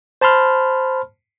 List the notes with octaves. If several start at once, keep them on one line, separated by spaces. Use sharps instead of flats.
C5 A5 B5 C6 F6